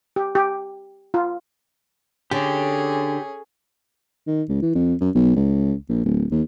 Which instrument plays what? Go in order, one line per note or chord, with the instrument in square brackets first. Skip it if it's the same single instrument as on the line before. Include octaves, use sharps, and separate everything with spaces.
[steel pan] G4
G4
F4
[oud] D3 [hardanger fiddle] C#4 G#4 [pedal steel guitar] G4 G5
[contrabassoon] D#3
C#2
E3
F2
F#2
B1
C#2
A#1
D1
D#2